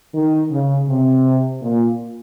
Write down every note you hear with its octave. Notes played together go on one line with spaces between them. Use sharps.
D#3
C#3
C3
A#2